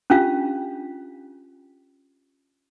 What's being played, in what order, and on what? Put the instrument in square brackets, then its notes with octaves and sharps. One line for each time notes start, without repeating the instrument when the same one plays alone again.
[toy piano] C#4 D4 F4 G4 F5